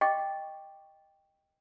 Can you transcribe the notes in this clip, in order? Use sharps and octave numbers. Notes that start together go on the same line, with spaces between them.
D#5 G5 C#6 D6